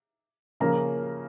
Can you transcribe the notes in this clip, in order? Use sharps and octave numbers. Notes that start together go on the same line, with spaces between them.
C#3 F3 A#3 C#4 A#5